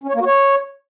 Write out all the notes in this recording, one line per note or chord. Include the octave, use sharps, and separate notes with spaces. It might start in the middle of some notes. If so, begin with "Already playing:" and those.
C#4
C#5
A#3
F#4
C#5